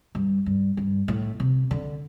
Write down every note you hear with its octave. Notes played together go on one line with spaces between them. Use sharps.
G2
G2
G2
A2
C3
D3